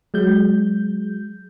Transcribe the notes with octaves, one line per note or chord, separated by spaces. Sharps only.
F#3 G#3 G6